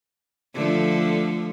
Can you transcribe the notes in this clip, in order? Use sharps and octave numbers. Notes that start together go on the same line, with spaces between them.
D3 F3 A3